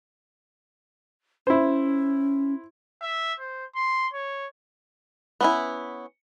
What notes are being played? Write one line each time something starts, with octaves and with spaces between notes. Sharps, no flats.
C#4 E4 C5
E5
C5
C6
C#5
B3 C#4 E4